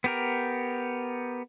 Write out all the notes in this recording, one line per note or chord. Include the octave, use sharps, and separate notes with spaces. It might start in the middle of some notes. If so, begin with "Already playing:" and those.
B3 G4 A#4